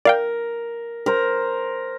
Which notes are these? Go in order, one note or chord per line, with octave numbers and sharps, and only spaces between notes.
A#4 D5 F5 G5
A#4 C5